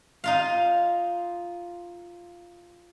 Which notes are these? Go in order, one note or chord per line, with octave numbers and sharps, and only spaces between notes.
D#4 F4 F5